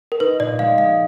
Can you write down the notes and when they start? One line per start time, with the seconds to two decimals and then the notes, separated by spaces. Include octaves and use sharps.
0.12 A#4
0.20 D#4 B4
0.39 A#2 D5
0.59 G#3 F5
0.78 G#3 F5